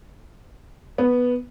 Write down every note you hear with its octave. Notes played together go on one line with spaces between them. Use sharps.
B3